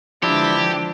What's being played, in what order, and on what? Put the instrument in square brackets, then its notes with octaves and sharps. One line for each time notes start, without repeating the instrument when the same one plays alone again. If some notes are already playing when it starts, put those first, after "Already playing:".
[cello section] D3 E3 G#3 [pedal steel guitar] F3 D4 [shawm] E4 [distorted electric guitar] G4